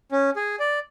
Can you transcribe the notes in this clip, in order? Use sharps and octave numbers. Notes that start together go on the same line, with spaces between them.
C#4
G#4
D5